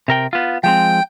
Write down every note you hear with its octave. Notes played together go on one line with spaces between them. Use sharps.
C3 A#4 G5
B3 F4
F3 G#3 C4 G5